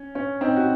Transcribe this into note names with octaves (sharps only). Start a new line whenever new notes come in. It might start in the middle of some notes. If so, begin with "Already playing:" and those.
Already playing: C#4
C#4
C4 D#4
F#4